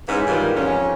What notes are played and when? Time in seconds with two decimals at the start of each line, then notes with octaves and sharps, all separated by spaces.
0.08 G#2 E3 C#4
0.27 G#2 D#3 E3 G3 F4 A#4
0.57 F2 C#4